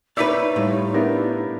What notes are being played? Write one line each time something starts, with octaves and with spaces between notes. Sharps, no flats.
D#4 E4 B4 C#5 D5 E6 B6
A2 G3 F4
B3 D4 E4 G4 A#4